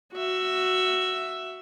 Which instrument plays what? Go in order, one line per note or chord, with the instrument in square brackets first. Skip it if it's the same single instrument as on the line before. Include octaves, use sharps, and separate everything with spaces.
[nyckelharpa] F#4 E5